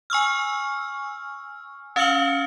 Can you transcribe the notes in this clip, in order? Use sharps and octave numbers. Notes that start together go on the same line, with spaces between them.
G#5 C#6 E6 F6
C#4 F5 E6 F6 C#7 F#7